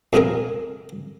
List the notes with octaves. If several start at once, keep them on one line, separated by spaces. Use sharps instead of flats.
F2 F3 B3 C4 G#4 A#4